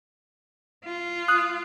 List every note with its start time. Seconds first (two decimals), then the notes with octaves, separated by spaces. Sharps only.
0.85 F4
1.28 D#6 F#6